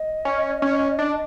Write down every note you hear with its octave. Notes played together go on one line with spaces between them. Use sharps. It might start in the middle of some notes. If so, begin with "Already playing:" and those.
Already playing: D#5
C#4
C#4
D4